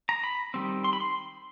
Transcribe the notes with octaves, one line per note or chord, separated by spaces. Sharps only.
A#5
B5
D#3 G3 C4
C6
B5
C6